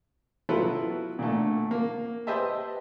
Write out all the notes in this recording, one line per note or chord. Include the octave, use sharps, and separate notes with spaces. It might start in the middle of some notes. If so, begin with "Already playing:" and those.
F#3 B3 E4 F4 A4 B4
A#2 D3 A3
A#3
G4 B4 C5 D#5 E5 A5